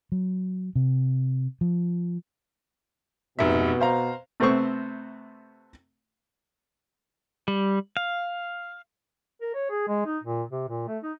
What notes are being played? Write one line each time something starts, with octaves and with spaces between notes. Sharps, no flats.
F#3
C3
F3
F1 G#2 B2 E5
C5 F5 A#5
C3 A3 B3 C4 C5 C#6
G3
F5
A#4
C#5
G#4
G#3
D#4
A#2
C3
A#2
A3
D#4